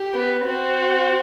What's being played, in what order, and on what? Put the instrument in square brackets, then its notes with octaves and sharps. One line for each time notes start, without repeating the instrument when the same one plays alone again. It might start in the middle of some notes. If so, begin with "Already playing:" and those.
Already playing: [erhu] G4
[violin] B3
[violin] C4 [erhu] F#4